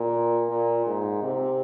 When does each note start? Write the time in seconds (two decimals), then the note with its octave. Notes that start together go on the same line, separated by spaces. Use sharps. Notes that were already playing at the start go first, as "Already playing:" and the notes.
Already playing: A#2
0.50 A#2
0.86 G#2
1.23 C3